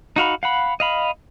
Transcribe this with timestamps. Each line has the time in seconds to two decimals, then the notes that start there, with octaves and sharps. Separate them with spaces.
0.16 D#4 F#4 F5 B5
0.43 F5 F#5 B5
0.80 D#5 F5 B5